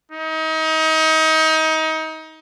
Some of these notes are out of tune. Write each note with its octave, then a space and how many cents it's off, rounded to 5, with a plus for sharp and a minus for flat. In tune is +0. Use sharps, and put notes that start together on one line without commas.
D#4 +30